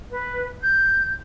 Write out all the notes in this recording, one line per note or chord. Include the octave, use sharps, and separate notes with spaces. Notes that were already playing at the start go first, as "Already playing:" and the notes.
B4
G6